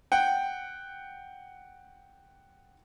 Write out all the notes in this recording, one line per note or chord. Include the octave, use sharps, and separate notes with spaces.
F#5 G5